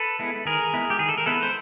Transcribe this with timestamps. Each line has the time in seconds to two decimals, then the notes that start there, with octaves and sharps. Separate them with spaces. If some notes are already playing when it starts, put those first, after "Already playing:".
Already playing: A4 B4
0.19 G#3 B3 E4
0.45 D#3 G#4 A#4
0.73 G#3 B3 E4
0.90 G4
0.99 D#3 G#4
1.09 A4
1.18 A#4
1.26 G#3 B3 E4 A4 B4
1.43 C5